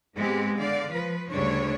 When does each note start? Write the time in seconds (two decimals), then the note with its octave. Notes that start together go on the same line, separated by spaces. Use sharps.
0.16 G#2 G#3 B3 C4 G4
0.57 D3 D5 F5
0.92 F3 B4
1.30 D2 C#3 G3 D4 C#5